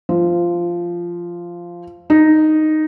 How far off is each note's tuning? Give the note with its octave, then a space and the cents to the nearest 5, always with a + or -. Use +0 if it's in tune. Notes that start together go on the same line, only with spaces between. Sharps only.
F3 -10
D#4 -5